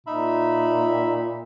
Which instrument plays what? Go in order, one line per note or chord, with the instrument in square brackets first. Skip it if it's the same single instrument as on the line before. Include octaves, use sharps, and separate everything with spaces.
[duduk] A#2 [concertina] D#4 E5 B5